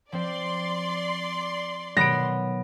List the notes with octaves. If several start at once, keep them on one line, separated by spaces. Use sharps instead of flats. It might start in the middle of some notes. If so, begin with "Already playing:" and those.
F3 C4 C5 D5 C6
B2 D#3 F#3 B3 A#6 D7